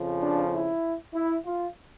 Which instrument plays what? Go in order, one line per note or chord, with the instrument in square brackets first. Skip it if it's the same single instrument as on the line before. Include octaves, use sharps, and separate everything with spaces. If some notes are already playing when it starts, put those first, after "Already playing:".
Already playing: [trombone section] F2 C#3 F3
D4
E4
E4
F4